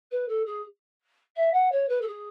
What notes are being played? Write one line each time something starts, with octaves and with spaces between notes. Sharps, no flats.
B4
A4
G#4
E5
F#5
C#5
B4
A4
G#4